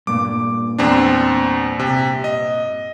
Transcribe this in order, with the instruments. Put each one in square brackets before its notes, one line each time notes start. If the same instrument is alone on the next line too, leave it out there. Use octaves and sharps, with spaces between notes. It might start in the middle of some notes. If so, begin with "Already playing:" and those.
[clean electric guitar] G2 A#2 [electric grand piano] D6
[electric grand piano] E2 C4 D4
C3
D#5